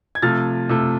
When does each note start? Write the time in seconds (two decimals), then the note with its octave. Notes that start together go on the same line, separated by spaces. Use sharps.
0.15 G#6
0.22 C3 F3 A3 F6 A6
0.69 C3 F3 A3